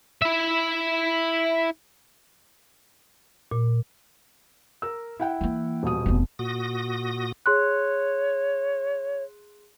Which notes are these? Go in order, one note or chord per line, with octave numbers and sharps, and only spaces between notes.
E4 E5
A#2
A#4 E6
E4 F#5 G5
E3 A#3
D#1 B2 D#6
F1 B3
A#2 F#4 D#6 A#6
G#4 C#5 C6 F#6